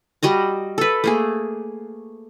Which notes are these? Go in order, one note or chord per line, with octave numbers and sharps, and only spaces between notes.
G3 F#4 D#5 A#5
A4 B4
A3 A#3 G#4